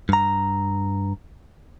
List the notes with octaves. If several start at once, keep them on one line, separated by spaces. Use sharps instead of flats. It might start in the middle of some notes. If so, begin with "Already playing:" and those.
G2 A#5